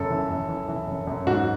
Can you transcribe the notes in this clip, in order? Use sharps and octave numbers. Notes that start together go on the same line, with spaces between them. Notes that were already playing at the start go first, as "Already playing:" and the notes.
Already playing: F#2 C#3 A4
E3
F#2
E3
E3
F#2
F#2
G#2 F#4